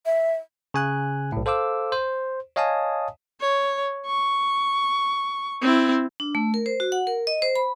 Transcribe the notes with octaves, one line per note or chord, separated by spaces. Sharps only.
E5
C#3 G#5 F#6
B1 A2
A4 C5 F5 D6 E6
C5
C#5 D#5 F5 G#5 A5 D#6
C#5
C#6
C4 E4
D4
A3
A#4
C5
F#4
F#5
A#4
D#5
C5
B5